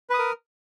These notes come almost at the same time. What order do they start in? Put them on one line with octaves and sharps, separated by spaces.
B4 D#6 A#4